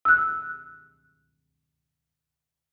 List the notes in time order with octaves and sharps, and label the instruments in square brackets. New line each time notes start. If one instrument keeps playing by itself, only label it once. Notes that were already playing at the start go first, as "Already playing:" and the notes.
[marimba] E6 F#6